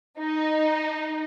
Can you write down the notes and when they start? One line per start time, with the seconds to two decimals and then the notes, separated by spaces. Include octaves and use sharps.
0.19 D#4